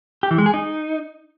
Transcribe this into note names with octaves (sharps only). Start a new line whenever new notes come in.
G4
E3
G#3
G#4
D#4